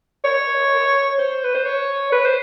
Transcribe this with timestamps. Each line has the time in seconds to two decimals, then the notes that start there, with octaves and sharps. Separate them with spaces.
0.25 C#5
1.18 C5
1.44 B4
1.55 C5
1.66 C#5
2.12 B4
2.25 C5